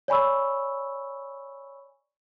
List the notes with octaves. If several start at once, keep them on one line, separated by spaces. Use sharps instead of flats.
C#5 D5 G#5 B5 C#6 E6